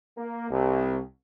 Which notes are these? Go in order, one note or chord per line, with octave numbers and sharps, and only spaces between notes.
A#3
C2